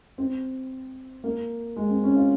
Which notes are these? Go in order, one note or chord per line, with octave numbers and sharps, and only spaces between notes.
C4
A#3
G#3
C4
C#4
F4